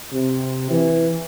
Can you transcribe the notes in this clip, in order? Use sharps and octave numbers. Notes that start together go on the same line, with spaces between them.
C3
E3